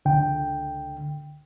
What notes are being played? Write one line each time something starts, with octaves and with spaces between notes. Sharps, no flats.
C#2 D3 G5